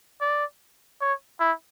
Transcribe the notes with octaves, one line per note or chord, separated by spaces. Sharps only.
D5
C#5
E4